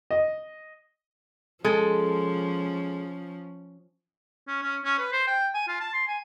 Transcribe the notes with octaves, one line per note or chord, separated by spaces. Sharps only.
D#5
F3 G#3 C#4 A4
C#4
C#4
C#4
B4
C5
G5
G#5
F4
A5
C6
G#5